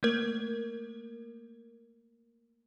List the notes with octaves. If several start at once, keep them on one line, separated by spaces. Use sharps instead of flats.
A3 A#3 A#4